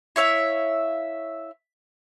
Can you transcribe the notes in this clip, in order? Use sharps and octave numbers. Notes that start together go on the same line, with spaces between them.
E4 C#5 E5 F5